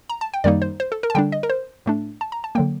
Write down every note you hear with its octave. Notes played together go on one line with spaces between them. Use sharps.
A#5
A5
G5
F#2 D#3 G3 A#3 D#4 D5
C5
C5
A4
A#4
A5
D3 G3 D4 G5
D#5
A#4
C5
A2 A3 D4
A5
A#5
A5
D3 F#3 A#3 G5